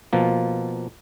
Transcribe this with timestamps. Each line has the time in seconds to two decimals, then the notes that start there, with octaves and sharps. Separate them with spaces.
0.13 B2 F3 A#3